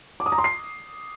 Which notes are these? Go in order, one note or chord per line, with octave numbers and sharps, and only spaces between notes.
D6
D#6
A#5
C6
C7